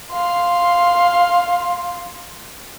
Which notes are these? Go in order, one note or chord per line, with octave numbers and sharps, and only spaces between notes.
F5 C6